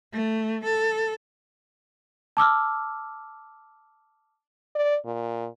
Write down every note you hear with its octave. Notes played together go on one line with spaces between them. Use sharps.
A3
A4
A5 D6 E6 F6
D5
A#2